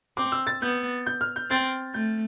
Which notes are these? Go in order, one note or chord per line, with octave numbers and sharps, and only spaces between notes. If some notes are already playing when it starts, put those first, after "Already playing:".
C4 D6
E6
A6
B3 G6
G6
F6
G6
C4 A6
A3 G6